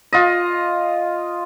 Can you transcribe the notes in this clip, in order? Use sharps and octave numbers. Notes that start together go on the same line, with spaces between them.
F4 D#5